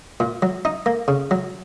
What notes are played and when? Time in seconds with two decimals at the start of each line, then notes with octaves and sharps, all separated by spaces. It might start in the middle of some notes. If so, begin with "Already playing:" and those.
0.20 A#2
0.42 F#3
0.65 D#4
0.86 A#3
1.08 C#3
1.31 F#3